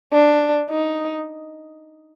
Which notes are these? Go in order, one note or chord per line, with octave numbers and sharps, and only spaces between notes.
D4
D#4